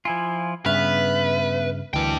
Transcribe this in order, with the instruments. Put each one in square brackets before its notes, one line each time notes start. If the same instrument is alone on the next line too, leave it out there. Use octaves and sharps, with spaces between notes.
[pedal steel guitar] F3 E4 F4 [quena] G#5
[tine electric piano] G2 C#3 F6 [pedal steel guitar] B3 [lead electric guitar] B4 [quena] E5
[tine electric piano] D2 E3 [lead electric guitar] D4 G5